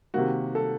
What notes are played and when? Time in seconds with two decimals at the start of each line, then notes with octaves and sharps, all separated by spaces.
0.14 C3 D#3 A#3 F#4
0.55 A4